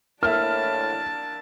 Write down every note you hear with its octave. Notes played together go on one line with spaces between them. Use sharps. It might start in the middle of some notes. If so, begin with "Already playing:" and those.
A2 A#3 D4 E4 E5 A5 F6